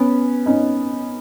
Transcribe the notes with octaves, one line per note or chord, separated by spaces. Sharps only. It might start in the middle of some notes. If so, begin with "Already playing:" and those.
Already playing: B3 C#4
C#4 D#4